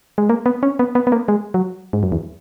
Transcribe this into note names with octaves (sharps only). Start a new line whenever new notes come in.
G#3
A#3
B3
C#4
B3
B3
B3
A#3
G#3
F#3
G#2
F#2
E2